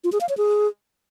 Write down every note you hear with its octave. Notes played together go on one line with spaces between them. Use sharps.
F4
G#4
F5
C#5
G#4